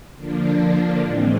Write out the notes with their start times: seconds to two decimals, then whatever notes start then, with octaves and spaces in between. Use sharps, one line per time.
0.16 D3 F3 A#3 D4
1.01 A2 E3 G#3 C4